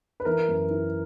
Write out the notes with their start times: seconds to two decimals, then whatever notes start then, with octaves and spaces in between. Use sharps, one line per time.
0.20 B4
0.25 E3 A#4
0.48 F#2
0.71 E4